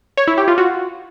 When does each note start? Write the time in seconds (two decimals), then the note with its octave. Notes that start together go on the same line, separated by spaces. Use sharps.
0.17 C#5
0.28 E4
0.38 G4
0.48 F4
0.58 F#4